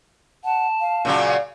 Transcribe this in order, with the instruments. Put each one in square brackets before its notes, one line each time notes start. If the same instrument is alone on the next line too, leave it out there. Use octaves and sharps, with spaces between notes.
[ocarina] F#5 [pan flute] A5
[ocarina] F5
[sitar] A#2 C#3 F#3